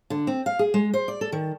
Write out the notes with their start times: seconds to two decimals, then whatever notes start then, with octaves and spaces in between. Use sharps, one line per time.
0.10 D3
0.27 C4
0.46 F5
0.59 G#4
0.74 G#3
0.94 C5
1.08 D5
1.21 A4
1.32 D#3